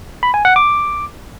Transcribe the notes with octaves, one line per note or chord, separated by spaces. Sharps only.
B5
G#5
F#5
D6